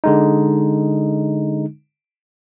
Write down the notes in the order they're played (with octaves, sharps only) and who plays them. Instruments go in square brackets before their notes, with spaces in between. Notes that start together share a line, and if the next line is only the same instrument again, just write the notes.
[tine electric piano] D3 G#3 D#4